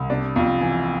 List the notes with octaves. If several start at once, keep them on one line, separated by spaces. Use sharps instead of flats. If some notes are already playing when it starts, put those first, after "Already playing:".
Already playing: C2
C3 D4
F2
E3